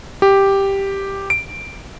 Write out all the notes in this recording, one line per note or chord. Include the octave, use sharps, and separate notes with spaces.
G4
D7